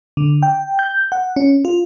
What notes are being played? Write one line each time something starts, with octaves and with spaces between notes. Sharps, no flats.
D3
G5
G6
F#5
C#4
F4